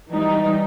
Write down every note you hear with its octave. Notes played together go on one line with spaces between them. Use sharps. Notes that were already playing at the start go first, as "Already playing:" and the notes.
E3 G3 D#4